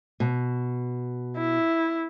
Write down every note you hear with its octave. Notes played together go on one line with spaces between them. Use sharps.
B2
E4